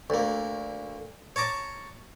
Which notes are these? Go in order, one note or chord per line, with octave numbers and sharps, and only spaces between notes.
D2 A#3
C#5 A5 A#5 D6